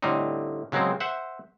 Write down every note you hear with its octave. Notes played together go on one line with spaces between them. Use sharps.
A2 D3 G3 C4 D#4
C#3 F#3 G#3 A#3 C4
C5 E5 F#5